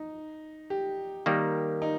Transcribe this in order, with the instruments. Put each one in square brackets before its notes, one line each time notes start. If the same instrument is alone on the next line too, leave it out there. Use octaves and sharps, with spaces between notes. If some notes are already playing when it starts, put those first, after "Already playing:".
Already playing: [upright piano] D#4
G4
[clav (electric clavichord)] D#3 G3 A#3
[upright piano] D#4